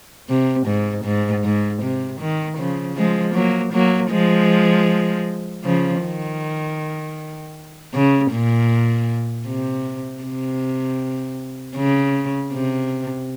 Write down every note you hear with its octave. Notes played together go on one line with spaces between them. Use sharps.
C3
G#2
G#2
G#2
C3
D#3
C#3 F3
F3 G#3
F#3 A#3
F#3 A#3
F3 G#3
C#3 F3
D#3
C#3
A#2
C3
C3
C#3
C3